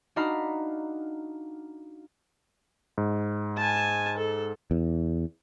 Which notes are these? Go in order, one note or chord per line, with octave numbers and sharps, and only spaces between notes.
D4 D#4 F#4 F5 A#5 B5
G#2
G#5 A5
A4
E2